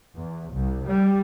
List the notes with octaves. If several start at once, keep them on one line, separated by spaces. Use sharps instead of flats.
E2
C2
G3